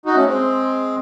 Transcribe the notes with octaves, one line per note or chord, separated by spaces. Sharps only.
D#4 F#4
A3 C#4
G#3 C4